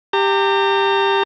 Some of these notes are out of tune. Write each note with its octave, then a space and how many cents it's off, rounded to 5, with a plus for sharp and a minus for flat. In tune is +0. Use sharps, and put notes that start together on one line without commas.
G4 +10 A#5 -35